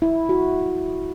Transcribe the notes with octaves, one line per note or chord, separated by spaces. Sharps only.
E4
F#4